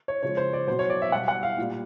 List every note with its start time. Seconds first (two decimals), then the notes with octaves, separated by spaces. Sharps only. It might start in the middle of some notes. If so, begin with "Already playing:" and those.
0.08 C#5
0.23 C#3 F3 G#3 C#5
0.37 C5
0.53 D5
0.67 F#3 C5
0.71 B2
0.79 C#5
0.90 D5
1.02 E5
1.12 B2 G3 F#5
1.28 F#5
1.43 F5
1.58 A#2 G3